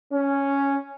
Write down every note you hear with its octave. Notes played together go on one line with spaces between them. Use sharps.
C#4